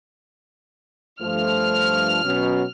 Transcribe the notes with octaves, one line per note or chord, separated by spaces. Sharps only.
G2 F3 A3 F6
B2 F#3 C#4